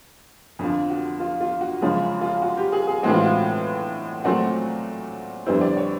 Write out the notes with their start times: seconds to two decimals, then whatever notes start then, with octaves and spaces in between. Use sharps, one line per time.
0.59 F2 D3 F3
0.90 F#4
1.20 F4
1.41 F4
1.61 F#4
1.81 F#2 C#3 F3 G#3
2.21 F4
2.42 F#4
2.57 G4
2.72 G#4
2.87 G#4
3.03 A2 E3 G#3 C4 F#4
3.14 F4
3.25 F#4
4.24 A#2 F#3 A3 C4 F#4
5.46 F2 D3 G3 B3 E4 C5
5.61 D5
5.77 C#5